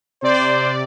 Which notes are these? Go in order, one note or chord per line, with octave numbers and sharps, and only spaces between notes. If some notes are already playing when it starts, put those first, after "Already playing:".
C3 C5 D5